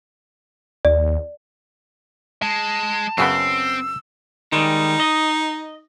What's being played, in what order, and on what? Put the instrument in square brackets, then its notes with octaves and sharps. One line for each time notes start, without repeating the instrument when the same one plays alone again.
[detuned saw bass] D#2 [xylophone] D5
[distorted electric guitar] G#3 [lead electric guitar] A5
[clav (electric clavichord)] F#2 C#3 B3 [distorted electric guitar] C4 [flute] E6
[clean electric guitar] D#3 G3 G#3 [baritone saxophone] D#4
[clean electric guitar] D#5